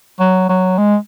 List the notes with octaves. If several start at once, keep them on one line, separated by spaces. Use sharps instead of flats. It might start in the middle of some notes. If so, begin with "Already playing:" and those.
F#3
F#3
G#3